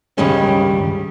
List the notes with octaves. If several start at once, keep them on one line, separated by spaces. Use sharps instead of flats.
C#2 G2 D#3 G3 G#3 C#4